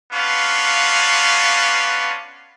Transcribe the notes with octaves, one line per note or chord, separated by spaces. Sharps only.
B3 C#4 D4 F4 F5